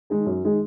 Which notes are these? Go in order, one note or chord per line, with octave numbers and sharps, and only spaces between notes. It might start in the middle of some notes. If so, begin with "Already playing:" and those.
D#3 G#3 D#4 G#4
F#2
D#3 G#3 D#4 G#4